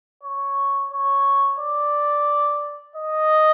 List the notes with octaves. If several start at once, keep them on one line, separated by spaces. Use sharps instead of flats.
C#5
C#5
D5
D#5